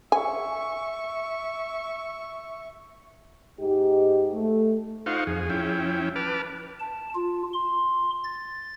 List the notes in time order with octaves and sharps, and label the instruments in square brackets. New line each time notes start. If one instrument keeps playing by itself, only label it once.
[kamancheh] E5 C#6 [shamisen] G#5
[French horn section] G#2 D#4 G4
A3
[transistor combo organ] D#4 F4 C5 F5 F#5 C#6
F2 G#4
F3 C#4 E4 G5
B4 A5 D6 F6
[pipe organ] A5
F4
C6
A6